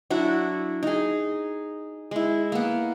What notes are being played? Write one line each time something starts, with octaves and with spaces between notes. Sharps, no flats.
F#3 D4 E4 F#4
D#4 G#4
G#3 E4
A#3 B3